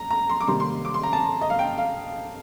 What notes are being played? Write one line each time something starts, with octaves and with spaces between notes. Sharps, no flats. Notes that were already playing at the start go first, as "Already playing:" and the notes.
Already playing: A#5
A#5
C6
D6
C3 D#3 G3 A#3 C6
C6
D6
C6
A#5
A5
D#5
F5
G5
F5